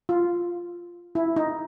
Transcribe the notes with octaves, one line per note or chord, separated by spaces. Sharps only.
F4
E4
D#4